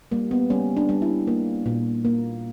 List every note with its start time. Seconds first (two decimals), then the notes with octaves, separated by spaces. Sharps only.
0.11 G3 A#3
0.31 B3
0.50 G3 C#4
0.77 D4
0.89 G3
1.02 E4
1.27 A#3
1.66 A#2
2.05 A#3